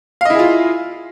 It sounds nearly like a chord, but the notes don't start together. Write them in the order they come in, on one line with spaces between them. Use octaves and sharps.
F5 D#5 E4 G#4 F4